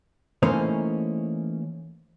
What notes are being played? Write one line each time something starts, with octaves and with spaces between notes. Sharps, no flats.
E3 A3 A#3 C#4 D#4 C5